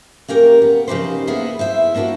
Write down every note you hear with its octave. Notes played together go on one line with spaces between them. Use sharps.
A#3 C#4 G4 A#4
B3
C#3 F3 D#4 G4 B4 C5
A#3 B3 E4 G#4
E4 C5 E5
A#3 B3 D4 E4 F#4